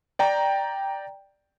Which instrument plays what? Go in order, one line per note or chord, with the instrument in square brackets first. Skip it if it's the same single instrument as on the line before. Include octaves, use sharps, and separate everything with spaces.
[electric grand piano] D5 G5 A#5